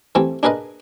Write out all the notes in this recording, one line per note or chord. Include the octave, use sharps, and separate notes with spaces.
E3 A3 C4 G4
D4 G#4 A#4 B4 D#5